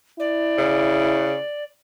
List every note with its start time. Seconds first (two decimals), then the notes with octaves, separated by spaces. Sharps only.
0.20 E4 D5
0.58 C#3